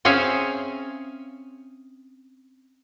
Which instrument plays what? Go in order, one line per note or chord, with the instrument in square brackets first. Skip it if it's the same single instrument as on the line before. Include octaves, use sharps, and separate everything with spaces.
[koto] C4 C#4 G#4 E5 F5 G#5